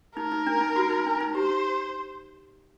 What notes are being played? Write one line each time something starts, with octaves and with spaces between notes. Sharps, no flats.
D#4 A#4
D#4
D4
D#4
F#4
D#4
D4
D#4
G4 C5